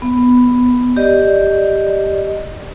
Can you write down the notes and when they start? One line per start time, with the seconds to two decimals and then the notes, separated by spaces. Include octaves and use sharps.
0.02 B3
0.97 G4 D5 D#5